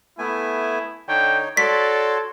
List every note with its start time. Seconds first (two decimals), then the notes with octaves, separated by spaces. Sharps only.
0.19 A3 B3 E4 G#5
1.08 D3 D#4 C#5 G5
1.57 F#4 A4 C#5 D5 C6 B6